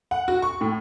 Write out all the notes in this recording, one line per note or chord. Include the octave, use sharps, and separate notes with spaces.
F#5
F#4
C#6
A2